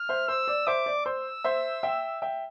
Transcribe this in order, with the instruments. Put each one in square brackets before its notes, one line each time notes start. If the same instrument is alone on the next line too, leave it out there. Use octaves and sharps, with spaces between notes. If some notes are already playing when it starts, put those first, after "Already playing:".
Already playing: [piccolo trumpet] F6
[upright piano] C5 E5
[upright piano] C5 [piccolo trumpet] E6
[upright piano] D5
[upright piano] C5 E5 [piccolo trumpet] D6
[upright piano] D5
[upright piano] C5 [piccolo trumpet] E6
[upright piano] C5 E5
E5 G5
E5 G5